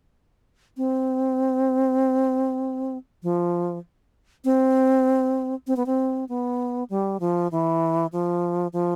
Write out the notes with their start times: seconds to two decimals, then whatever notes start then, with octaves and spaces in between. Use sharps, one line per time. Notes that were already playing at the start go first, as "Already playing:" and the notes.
0.77 C4
3.23 F3
4.44 C4
5.67 C4
5.76 B3
5.86 C4
6.29 B3
6.90 G3
7.20 F3
7.51 E3
8.12 F3
8.73 F3